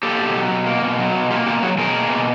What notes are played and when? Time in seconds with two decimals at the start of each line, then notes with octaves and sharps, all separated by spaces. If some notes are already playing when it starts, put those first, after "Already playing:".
0.03 A#3 G4 A4
0.19 B2
0.35 F#3
0.51 B2
0.66 A#3
0.82 B2
0.99 F#3
1.15 B2
1.31 A#3 F4 G4
1.46 B2 F4 G4
1.62 F#3 F#4 G#4
1.78 B2 G#4 A#4
1.95 A#3
2.10 B2